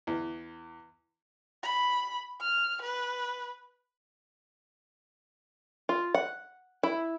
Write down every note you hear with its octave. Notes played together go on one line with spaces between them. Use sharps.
E2
B5
F6
B4
F4
F#5
E4